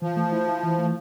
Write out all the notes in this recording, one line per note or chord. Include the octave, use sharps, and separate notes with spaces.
E3 F3
A3
E4
E4
E3
A3